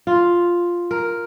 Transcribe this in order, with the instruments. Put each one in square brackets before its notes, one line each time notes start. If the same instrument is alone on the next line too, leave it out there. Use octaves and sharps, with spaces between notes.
[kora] F4
A#4